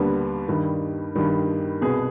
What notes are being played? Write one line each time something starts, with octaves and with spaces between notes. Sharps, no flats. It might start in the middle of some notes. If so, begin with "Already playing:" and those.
Already playing: D#2 D3 G3 B3 D4
G2 D#3 G3
G2 D#3 G3
C2 B2 B3 G#4